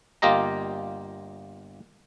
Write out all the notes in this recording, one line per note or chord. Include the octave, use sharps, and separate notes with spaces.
G1 A#3 F4 G4 D#5 A#5